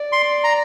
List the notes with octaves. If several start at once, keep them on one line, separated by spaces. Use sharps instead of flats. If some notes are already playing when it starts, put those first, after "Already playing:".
Already playing: D5
C6
A#5